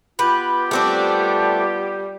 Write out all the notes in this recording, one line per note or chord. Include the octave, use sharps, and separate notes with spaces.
B3 F4 G4 B4
G3 A3 C4 D4